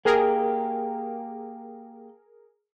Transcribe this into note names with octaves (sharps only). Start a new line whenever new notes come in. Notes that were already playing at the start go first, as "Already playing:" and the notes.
A#3 G4 G#4 A#4